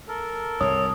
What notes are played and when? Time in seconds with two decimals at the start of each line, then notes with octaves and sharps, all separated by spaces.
0.08 A4 A#4
0.61 C2 G#2 C3 C#5 D#6